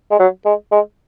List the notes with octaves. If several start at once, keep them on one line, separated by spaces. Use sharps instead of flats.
G#3
F#3
G#3
G#3